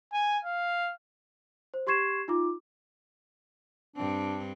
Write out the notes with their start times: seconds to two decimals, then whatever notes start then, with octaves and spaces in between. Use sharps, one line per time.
0.12 G#5
0.45 F5
1.74 C5
1.87 G4 C6 C#6 G#6 C7 E7
2.28 D#4 F4 D6
3.96 G2 C4 D4